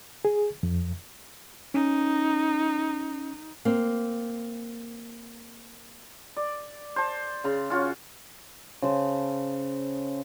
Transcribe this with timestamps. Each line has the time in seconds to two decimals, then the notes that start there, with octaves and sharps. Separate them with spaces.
0.25 G#4
0.63 F2
1.74 C#4 D#4
3.65 A#3 C4
6.36 D5
6.96 C5 A5
7.44 C#3 C6
7.70 C#4 F4 F#4
8.82 C#3 C5 A5